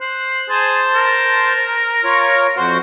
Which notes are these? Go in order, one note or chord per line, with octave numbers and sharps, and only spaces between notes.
C5 F#6
G#4 C5 A5
A#4
F4 C#5
F2 F#4 C5